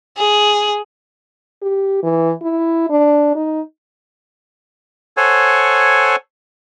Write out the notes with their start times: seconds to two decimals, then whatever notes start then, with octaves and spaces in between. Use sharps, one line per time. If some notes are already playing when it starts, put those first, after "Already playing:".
0.17 G#4
1.62 G4
2.03 E3
2.42 E4
2.90 D4
3.35 D#4
5.17 A4 C5 C#5 F#5 G#5